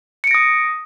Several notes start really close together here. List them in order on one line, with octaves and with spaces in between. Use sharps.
C#7 D7 A#6 D#6